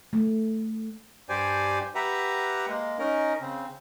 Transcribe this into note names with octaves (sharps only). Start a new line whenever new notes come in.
A3
G2 G4 C5 D5 G#5
G4 B4 E5 F#5 A#5
G#3 A#3
C#4 D#4 A#4
C#3 C4